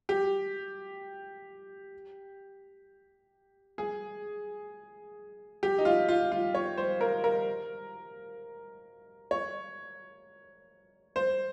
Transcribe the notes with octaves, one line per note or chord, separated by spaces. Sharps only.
G4
G#4
G4
D#4
F4
F4
F4
C#5
C5
A#4
A#4
C#5
C5